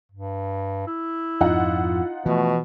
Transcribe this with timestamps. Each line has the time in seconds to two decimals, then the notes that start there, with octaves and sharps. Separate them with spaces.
0.11 G2
0.87 E4
1.41 F2 G#2 D#4 F4 F#5
2.26 B2 E3 F3 A3